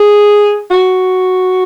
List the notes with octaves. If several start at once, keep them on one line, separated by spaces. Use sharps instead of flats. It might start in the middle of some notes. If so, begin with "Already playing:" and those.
Already playing: G#4
F#4